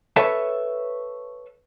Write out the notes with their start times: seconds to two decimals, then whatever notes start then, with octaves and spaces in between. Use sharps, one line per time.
0.16 A4 B4 C#5 E5 A5